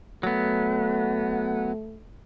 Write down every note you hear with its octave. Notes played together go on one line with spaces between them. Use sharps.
F#3 A3 B3